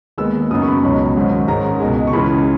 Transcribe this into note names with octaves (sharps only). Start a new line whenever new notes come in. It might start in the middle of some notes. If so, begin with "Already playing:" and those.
D#2 D#3 G#3 B3 E6
F#2 C#3 F#3 B3 D#4 D#6
C#6
B5
C#6
C#2 B2 F#3 C#4 B5
G#1 G#2 F#3 C#4
G#2 D#3 G#3 C#4 A#5
C#2 B2 G#3
C#6
C#2 C#3 E3 B5